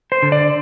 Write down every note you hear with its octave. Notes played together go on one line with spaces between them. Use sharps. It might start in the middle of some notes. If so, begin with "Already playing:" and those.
C5
D3
D5